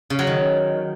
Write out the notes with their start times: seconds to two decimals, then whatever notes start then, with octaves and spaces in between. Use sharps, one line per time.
0.10 C#3
0.19 F#3
0.27 D#3